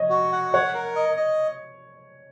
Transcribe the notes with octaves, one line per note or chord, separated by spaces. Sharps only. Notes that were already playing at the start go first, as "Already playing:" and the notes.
Already playing: C#5 D#5
F#4
F#5
C#5 F#5
A#4
D#5
D#5